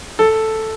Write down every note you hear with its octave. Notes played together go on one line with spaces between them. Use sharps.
A4